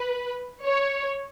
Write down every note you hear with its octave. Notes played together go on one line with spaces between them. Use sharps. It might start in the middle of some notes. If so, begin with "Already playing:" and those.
Already playing: B4
C#5